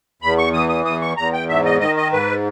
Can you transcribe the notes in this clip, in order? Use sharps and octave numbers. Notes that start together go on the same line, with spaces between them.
E2 B5
C#6
E3 D#6
D#6
E2 D#6
C#6
E2 A#5
G5
G#2 E5
D#5
D#3 D#5
D#5
G#2 B4